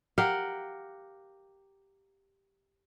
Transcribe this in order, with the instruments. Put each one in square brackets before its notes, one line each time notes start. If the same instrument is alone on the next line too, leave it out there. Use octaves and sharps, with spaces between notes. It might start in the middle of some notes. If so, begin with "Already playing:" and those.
[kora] G4 A#4 F5 F#5